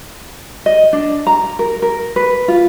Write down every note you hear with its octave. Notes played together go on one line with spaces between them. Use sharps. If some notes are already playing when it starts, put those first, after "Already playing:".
D#5
D4
A#5
A#4
A#4
B4
F4